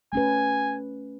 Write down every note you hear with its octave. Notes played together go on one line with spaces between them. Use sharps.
A3 C#4 B4 G#5